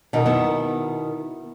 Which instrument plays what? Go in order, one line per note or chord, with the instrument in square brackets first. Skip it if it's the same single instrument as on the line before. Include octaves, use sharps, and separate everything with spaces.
[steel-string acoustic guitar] B2 D#3
[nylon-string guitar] B3 E4 E5